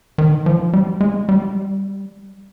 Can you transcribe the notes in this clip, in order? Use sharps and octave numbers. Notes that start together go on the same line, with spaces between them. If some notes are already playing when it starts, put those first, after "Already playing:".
D#3
F3
G3
G#3
G3